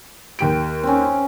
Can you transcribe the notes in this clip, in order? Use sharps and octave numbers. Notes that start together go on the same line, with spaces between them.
D#2 G4 D7
C4 C#4